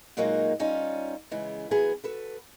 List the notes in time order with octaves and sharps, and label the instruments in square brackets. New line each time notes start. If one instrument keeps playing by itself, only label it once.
[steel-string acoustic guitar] A#2 F#3 G#3 A#3 D#4 F#4
G3 C#4 D#4 F4
C#3 E3 G#3 B3
E3 F#3 B3 G#4 G#5
F#4 A4 B4